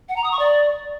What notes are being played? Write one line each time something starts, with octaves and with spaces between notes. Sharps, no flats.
F#5
A#5
D#6
C#6
D5